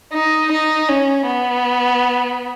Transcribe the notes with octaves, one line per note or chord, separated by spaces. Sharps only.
D#4
D#4
C#4
B3